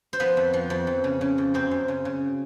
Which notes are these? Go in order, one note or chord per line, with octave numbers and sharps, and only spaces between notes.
C5
F3 B3 B4
F2
F3
F2
F2
C#3
C#3
F2
F#2 C4 C5
F#2
C#3
C#3